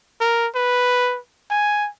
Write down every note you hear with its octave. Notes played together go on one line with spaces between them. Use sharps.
A#4
B4
G#5